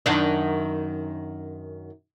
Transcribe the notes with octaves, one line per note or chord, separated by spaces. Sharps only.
F#2 D#3 D4